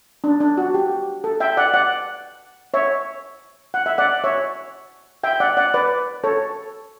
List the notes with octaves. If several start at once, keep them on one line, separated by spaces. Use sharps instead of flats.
D4
D4
F#4
G4
A4
E5 G5
D5 F#5
D5 F#5
C#5 E5
F#5
E5
D5 F#5
C#5 E5
E5 G5
D5 F#5
D5 F#5
B4 D5
A4 C#5